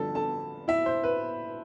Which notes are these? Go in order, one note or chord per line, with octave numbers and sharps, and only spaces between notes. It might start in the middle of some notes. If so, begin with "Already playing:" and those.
Already playing: G2 D3 F3 A4 A5
A4 A5
E4 E5
C5
B4